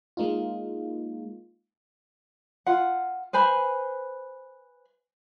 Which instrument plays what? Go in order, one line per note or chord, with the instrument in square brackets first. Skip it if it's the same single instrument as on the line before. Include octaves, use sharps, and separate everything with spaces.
[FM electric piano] G#3 A#3 D#4 F4
[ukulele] F4 F#5
B4 C5 G#5 B5